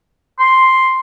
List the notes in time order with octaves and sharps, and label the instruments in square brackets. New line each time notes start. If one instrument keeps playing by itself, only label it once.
[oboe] C6